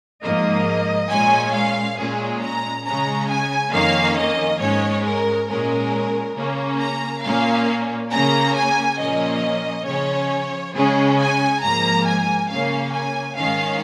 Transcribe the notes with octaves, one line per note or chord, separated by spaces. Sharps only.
G#2 F3 A#3 D#5
A#2 G#3 C#4 G#5
F5
A#2 G#3 C#4 G#4
A#5
C#3 G#3 C#4 A#5
G#5
F2 D#3 A#3 C#4 F5
D#5
G#2 G#3 C#4 C#5
A#4
A#2 G#3 C#4 A#4
C#3 A#3 C#4
A#5
A#2 A#3 C#4 F5
C#3 A#3 C#4 A#5
G#5
A#2 F3 A#3 C#4 D#5
C#3 F3 C#4 C#5
C#3 G#3 C#4 G#4
G#5
G#2 F3 A#3 A#5
G#5
C#3 A#3 C#4 F5
G#5
G#2 D#3 C#4 F5